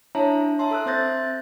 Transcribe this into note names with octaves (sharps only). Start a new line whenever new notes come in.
D4 E4 C#5 E5 A5 A#5
E5 A5 C6
A4 E6 F#6
C4 C5 E5 G6 A6 A#6